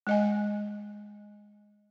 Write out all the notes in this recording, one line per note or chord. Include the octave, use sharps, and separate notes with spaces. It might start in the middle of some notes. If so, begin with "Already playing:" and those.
G#3 D#5 G#5